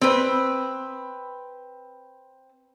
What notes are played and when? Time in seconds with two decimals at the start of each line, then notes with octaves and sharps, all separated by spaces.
0.01 C4 B4